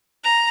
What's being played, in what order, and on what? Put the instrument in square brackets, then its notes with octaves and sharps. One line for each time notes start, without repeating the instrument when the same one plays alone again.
[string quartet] A#5